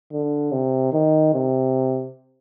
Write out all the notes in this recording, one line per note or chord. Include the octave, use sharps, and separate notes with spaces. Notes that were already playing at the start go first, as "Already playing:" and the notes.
D3
C3
D#3
C3